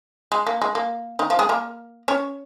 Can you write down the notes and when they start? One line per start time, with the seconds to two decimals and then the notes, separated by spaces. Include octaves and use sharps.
0.32 G#3
0.47 A#3
0.61 G#3
0.75 A#3
1.19 D#3 D#4
1.30 F3 F4
1.39 G#3 G#4
1.49 A#3 A#4
2.08 C#4 C#5